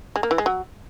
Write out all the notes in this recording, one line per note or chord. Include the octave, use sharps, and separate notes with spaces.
G#3
A#3
E3
G#3
F#3